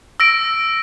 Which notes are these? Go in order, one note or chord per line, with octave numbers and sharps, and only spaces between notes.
E6 A#6 D7